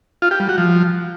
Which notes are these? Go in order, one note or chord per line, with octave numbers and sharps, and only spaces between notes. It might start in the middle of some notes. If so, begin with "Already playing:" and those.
F4
G4
G3
F#4
F3